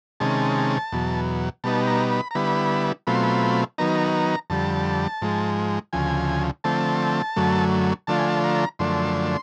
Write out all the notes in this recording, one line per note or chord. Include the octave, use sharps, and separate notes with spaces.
C3 D#3 G#3 C#4 A5
E2 B2 F#3
B2 G3 B3 D#4 A5
A#5
B5
A#5
D3 G3 B3 E4 B5
B2 F#3 A3 C4 F4 B5
C6
B5
D#3 F#3 B3 D#4 A#5
A#5
F2 D3 G3 A5
G#2 F3 G#3
D2 C#3 F3 G#5
D3 F3 A3 C4 A5
F#2 D3 F#3 A3
D3 F3 A3 D4 F4 A5
G#5
A5
A#5
F#2 D3 F3 A3 D4 C6